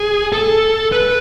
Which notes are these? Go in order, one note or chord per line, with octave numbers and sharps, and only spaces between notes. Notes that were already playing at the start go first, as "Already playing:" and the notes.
Already playing: G#4
A4
B4